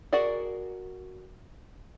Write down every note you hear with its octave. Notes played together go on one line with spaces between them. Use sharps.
F#4 G#4 A#4 D5 F#5